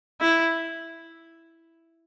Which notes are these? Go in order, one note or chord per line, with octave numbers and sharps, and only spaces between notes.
E4